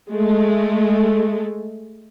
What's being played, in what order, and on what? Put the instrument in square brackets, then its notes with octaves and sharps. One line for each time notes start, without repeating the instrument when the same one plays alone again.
[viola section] G#3 A3